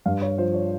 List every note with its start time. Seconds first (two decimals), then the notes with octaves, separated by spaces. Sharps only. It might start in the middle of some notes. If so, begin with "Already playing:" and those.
0.06 G2 F5
0.22 C#5
0.38 F3 C5
0.54 C#5